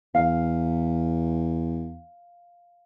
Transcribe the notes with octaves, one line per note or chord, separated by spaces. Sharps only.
E2 F5